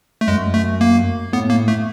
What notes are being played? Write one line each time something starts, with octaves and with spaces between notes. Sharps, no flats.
A3
F#2 G#3
A3
A#3
A2 B3
A#3
A3